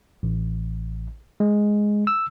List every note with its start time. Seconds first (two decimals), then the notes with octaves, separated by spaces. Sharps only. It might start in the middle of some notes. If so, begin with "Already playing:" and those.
0.23 A1
1.40 G#3
2.07 E6